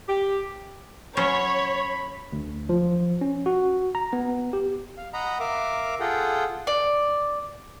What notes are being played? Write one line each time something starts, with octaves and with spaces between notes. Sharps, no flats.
G4
F#3 C#4 C5 C#5 B5
D2
F3
C#4
F#4
A#5
B3
G4
F5
D#5 F#5 A#5 B5
A#4 E5 F5 D6
F4 G#4 A4 F#5 G5
D5